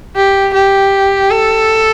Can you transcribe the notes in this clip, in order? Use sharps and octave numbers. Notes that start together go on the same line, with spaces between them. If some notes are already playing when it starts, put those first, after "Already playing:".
G4
G4
A4